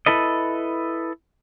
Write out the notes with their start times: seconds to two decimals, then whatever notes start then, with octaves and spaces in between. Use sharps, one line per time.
0.06 E4 A4 B4 D#5